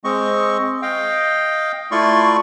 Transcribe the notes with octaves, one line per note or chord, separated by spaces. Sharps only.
G#3 C4 D#5 C#6
D#5 F5 G5
A3 E4 F4 D5 C6 C#6